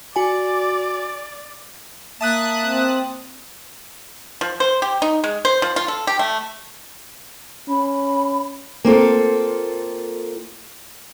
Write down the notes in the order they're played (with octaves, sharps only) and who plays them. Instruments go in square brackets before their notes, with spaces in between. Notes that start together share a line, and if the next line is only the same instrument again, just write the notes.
[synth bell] F#4 G#5 [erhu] D5
[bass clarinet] A#3 [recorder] E5 [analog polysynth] A5 D#6 F#6
[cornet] C4
[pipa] F3
C5
G4
D#4
G#3
C5
F3
F4
A4
G4
A3
[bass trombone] C#4 [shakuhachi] B5
[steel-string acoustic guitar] A#3 C4 F4 A4